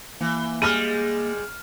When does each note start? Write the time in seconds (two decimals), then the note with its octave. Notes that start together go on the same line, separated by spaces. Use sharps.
0.21 E3 A#3
0.62 G3 G#3 F6 D#7